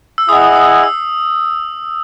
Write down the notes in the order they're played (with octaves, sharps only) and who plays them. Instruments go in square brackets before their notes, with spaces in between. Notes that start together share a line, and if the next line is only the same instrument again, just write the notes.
[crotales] E6
[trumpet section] E4 G#4 D#5 F#5 [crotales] D#6
[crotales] D#6
E6